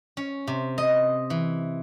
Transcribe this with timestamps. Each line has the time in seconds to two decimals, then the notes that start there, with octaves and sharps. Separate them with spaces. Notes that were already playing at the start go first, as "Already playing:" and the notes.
0.17 C#4
0.48 C3
0.78 D#5
1.30 E3